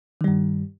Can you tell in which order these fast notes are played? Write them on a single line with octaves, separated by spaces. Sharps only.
D#3 G3 G2